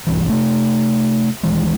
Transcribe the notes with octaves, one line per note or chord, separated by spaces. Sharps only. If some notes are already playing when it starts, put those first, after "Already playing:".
D1 B1 G2 E3
C3 A3
D1 D#3 E3 G#3